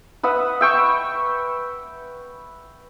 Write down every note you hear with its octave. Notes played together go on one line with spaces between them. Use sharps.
B4 D#5 E5 F#5
E5 G5 C#6